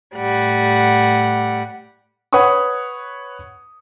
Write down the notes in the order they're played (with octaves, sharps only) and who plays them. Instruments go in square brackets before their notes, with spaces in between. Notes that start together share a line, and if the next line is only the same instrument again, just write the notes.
[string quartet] A2 G3 F#5
[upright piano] B4 C#5 F#5 B5 C#6 D#6